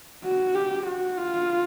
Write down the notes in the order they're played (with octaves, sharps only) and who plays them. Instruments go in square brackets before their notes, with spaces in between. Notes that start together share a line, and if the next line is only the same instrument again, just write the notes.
[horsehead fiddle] F#4
G4
F#4
F4